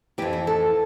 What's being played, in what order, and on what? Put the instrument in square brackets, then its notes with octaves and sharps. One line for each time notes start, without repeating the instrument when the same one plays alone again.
[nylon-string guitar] E3 G4
F2
E4
A4